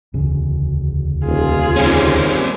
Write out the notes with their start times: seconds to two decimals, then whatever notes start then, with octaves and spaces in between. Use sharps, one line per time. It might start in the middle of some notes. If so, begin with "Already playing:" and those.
0.14 E1 D2 C#3
1.25 D#1 F4 G#4
1.76 D#2 G3 C4 C#4